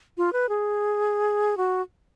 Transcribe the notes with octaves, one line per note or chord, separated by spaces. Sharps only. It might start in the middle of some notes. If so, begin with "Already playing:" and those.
F4
B4
G#4
F#4